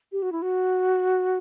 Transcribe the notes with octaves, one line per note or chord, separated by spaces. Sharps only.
G4
F#4
E4
F#4